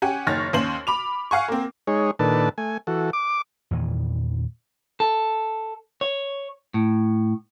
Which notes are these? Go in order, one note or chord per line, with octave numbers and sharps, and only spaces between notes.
C#4 G4 F#5 G#5
F#1 D#3 C#5 F6 A6 A#6
D#2 C#4 C5 F#7
B5 D6 F7
F5 F#5 G#5 C#6
A#3 C4
G#3 D#4 G#4 C#5
A#2 D#3 D4 A4 B4 A5
A3 G#5
E3 F#4 A4
D6
E2 A#2 D#3 E3
A4
C#5
A2